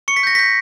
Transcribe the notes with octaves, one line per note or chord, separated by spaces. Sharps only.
C#6 C#7
B6
G6 A#6
G6 B6